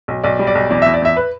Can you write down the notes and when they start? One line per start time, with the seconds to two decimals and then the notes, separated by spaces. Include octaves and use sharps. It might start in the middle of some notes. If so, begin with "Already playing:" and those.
0.08 B1
0.24 B1 D5
0.39 G3
0.47 D5
0.55 B1
0.70 E2 D5
0.82 E2 E5
0.94 D5
1.02 E2 E5
1.17 B4